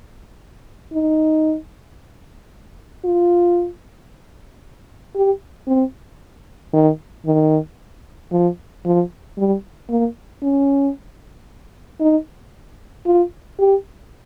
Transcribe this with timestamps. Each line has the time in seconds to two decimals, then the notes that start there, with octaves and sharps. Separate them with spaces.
0.93 D#4
3.05 F4
5.16 G4
5.67 C4
6.73 D#3
7.26 D#3
8.32 F3
8.85 F3
9.38 G3
9.90 A#3
10.43 C#4
12.00 D#4
13.06 F4
13.59 G4